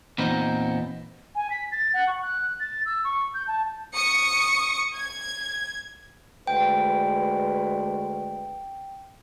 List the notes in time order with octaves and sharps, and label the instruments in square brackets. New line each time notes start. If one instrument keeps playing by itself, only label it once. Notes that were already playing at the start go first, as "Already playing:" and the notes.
[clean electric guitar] E2 A#2 B3 C4 D#4
[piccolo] G#5
B6
A6
F#5
C#6
F#6
A6
E6
C#6
G6
A5
[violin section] C#6 D#6 C#7
G#6
[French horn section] D2 G#3 B4 [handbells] G5